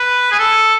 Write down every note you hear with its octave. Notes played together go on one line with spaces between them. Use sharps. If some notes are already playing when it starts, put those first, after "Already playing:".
Already playing: B4
G#4
A4